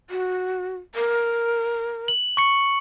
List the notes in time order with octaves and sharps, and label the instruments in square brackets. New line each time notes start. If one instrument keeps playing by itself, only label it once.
[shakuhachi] F#4
A#4
[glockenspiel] F#7
C#6 C#7